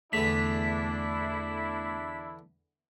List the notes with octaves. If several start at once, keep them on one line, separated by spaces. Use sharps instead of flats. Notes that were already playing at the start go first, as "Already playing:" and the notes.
E2 D3 A3 D4 E4 B6